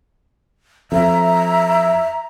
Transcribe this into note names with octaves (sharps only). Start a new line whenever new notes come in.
F2 E5 A#5